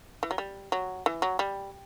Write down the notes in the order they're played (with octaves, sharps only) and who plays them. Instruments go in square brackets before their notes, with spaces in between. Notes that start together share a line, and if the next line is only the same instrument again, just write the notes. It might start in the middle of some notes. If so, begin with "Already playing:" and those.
[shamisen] E3
F#3
G3
F#3
E3
F#3
G3